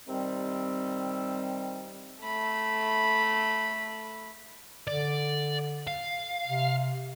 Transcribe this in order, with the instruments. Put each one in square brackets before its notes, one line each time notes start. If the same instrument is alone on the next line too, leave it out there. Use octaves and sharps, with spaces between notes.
[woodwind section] C3 D#3 G3 C4
[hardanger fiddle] A3 B5
[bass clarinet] D3 [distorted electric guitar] D5
[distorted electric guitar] F5
[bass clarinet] C3